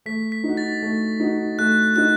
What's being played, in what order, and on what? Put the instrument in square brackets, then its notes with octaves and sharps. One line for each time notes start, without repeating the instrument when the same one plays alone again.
[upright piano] A3 [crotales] B6
[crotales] B6
[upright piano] D#4
F#4
[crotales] A6
[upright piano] A3
D#4 F#4
[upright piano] A3 [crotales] F#6
[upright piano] D#4 F#4 [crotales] F#6